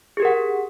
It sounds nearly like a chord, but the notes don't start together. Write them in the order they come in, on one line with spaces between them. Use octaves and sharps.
G#4 G4 A#4 F#5